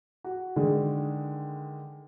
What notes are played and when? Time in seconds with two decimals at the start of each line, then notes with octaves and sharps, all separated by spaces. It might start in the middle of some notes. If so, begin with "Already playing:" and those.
0.24 F#4
0.56 D3 D#3 G#3